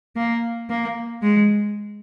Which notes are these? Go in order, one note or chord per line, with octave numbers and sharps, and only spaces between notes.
A#3
A#3
G#3